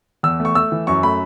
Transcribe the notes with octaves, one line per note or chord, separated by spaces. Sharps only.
E2 E6
A3
C#6
A3 E6
E3
F#2 C#6
A3 B5